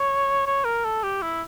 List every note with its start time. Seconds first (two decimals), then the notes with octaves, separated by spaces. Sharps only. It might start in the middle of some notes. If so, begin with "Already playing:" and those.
Already playing: C#5
0.46 C#5
0.65 A#4
0.85 A4
1.03 G4
1.22 E4